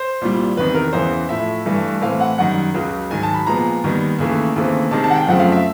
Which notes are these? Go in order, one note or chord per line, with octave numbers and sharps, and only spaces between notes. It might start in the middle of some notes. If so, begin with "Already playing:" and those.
Already playing: C5
C2 A#2 G3
E2 C3 D#3 B4
A#4
E2 C#3 E3 C5
A2 F3 A3 E5
G2 E3 A3
A2 E3 A3 C4 F5
F#5
F#2 D#3 G3 F#5
C#2 C#3 F#3
G#2 D#3 F#3 G#5
A5
B5
A#2 F3 G#3 B3 A#5
D#2 D#3 G3 B3
D#2 C#3 E3 A3
D#2 C#3 E3 A3 C4
C3 D#3 G#3 A5
A5
F#5
G5
F#2 C#3 F3 A3 C4 F#5
F5
E5